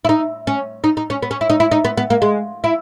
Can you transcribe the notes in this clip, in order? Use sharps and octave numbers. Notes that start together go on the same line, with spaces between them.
E4
D#4
C#4
D#4
D#4
C#4
B3
C#4
E4
D#4
E4
D#4
B3
B3
A#3
G#3
E4